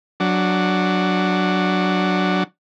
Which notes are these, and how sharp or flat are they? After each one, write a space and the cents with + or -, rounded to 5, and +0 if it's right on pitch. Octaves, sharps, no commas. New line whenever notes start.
F#3 +0 D4 +0